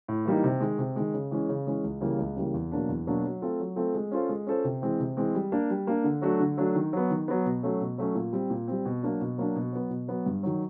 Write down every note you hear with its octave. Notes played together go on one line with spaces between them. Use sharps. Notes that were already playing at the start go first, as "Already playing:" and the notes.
A2
E3 G3 A#3 D#4
C3
D#3 G#3
C3
D#3 G#3
C#3
E3 G#3 C#4
C#3
E3 G#3 C#4
C#2
C#3 E3 G3 A#3
C#2
C#3 E3 G3 A#3
E2
B2 F#3 A#3 D4
E2
B2 F#3 A#3 D4
F#3
A3 C4 F4 A4
F#3
A3 C4 F4 A4
G#3
C#4 F4 A4 C5
G#3
C#4 F4 A4 C5
C3
E3 G#3 C4
C3
E3 G#3 C4
G3
A#3 D4
G3
A#3 D4
D3
F#3 A3 D4 F#4
D3
F#3 A3 D4 F#4
D#3
F#3 B3
D#3
F#3 B3
B2
F#3 A3 C#4
B2
F#3 A3 C#4
A#2
G3 C4
A#2
G3 C4
B2
F#3 A#3 D4
B2
F#3 A#3 D4
B2
F#3 B3
B2
F#3 B3
G2
D#3 F#3